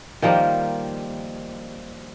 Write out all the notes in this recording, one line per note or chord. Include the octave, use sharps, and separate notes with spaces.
D#3 F3 G3 A#3